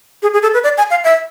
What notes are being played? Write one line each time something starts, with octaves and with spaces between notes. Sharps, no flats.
G#4
G#4
A4
B4
D5
G#5
F5
E5